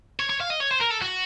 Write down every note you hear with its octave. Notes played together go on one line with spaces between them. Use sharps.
C#5
C#5
F5
D#5
C#5
C5
A#4
A4
F#4